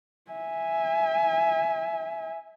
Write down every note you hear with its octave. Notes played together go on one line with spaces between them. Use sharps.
E5 G#5